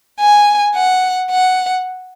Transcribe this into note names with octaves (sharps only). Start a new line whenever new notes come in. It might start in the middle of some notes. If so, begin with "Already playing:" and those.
G#5
F#5
F#5